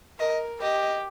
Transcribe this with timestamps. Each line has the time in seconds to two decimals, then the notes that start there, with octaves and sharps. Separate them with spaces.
0.19 A#4 D#5
0.61 G4 D#5